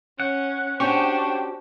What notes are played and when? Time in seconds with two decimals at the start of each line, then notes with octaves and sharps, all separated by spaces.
0.20 C#4 F#5
0.80 C#4 D4 F#4 G4 C5 G5 C#6